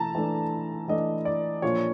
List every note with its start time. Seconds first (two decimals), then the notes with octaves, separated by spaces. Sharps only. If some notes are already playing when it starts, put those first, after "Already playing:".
Already playing: E3 A3 A5 A#5
0.15 E3 A3 D4
0.88 E3 A3 D4 D#5
1.25 D5
1.62 A#2 F3 A#3 D4 F4 C#5